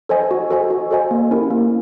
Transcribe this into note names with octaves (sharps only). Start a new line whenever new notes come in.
A4 C5 D#5 G#5
F#4
A4 C5 D#5 G#5
F#4
A4 C5 D#5 G#5
A#3
C#4 E4 G4 A#4
A#3